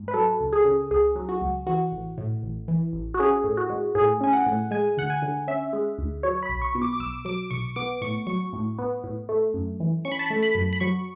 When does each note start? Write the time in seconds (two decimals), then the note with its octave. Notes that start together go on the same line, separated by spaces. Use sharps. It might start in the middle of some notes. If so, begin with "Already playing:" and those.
Already playing: G#2
0.08 B4
0.14 F#3 A4
0.40 C#2
0.53 G#4
0.65 C#3
0.91 C#2 G#4
1.16 F#3
1.29 F#4
1.41 C#2
1.67 E3 F#4
1.92 A1
2.18 A2
2.43 A1
2.68 E3
2.93 A1
3.14 F#4
3.19 C#4 G#4
3.44 A2
3.57 F#4
3.70 G#3
3.95 A2 G#4
4.21 C#4 G#5
4.33 F#5
4.47 A2
4.71 G#3 G#5
4.97 D2 F#5
5.10 G#5
5.22 D3
5.48 C#4 E5
5.73 G#3
5.98 D2
6.23 F#3 C#5
6.43 B5
6.49 B1
6.62 C#6
6.75 B2
6.82 D6
6.93 D6
7.00 B1 E6
7.25 F#3 D6
7.51 B1 C#6
7.76 B3 D6
8.01 A2 C#6
8.27 F#3 C#6
8.53 A2
8.78 B3
9.04 A2
9.29 A3
9.54 F#2
9.80 E3
10.05 C#4 C#6
10.12 B5
10.19 A5
10.26 A3 B5
10.43 B5
10.55 F#2
10.73 B5
10.80 F#3 C#6